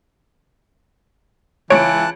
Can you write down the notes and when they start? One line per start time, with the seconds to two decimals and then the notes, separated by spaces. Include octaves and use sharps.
1.70 C#2 E3 C#5 A5 F#6 D7